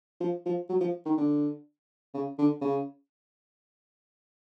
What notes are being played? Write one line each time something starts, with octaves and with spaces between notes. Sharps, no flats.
F3
F3
F#3
F3
D#3
D3
C#3
D3
C#3